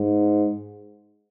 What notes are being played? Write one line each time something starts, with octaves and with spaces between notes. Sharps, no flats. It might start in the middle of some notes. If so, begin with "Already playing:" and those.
Already playing: G#2